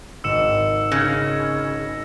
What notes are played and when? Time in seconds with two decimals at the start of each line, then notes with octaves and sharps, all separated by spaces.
0.24 G#1 E6 C#7 E7
0.92 C#3 G#6 A#6